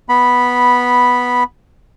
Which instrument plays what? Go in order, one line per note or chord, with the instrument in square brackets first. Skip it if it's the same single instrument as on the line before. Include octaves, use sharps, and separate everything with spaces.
[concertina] B3 B5